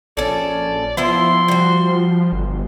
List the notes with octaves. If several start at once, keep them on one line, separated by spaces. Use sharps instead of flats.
A#1 C#4 A4 D5
F3 B3 E4 E5 C6
G3 F#4
G1